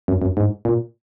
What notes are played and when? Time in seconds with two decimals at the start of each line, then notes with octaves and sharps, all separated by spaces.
0.08 F#2
0.22 F#2
0.37 G#2
0.65 A#2